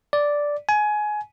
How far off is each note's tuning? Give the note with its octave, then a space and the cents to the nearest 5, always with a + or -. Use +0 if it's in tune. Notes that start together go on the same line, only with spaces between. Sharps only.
D5 -5
G#5 +20